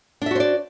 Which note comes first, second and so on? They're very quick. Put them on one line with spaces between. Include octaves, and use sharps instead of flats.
D4 E5 F#4 C5 D5